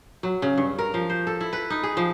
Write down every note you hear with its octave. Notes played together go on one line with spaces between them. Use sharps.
F#3
C#3
G2
A#4
F3
C5
A4
E4
B4
D#4
G#4
F3